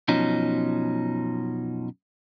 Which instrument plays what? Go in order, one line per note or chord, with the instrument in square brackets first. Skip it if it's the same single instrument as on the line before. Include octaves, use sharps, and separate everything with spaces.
[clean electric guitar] F#2 B2 F3 C#4 D#4